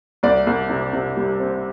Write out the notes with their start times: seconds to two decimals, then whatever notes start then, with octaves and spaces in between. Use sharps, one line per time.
0.23 C2 D5
0.47 C2
0.70 C3
0.93 C3
1.17 G3
1.40 C4